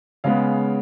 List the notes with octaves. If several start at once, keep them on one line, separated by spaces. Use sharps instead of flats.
C#3 G#3 B3 F5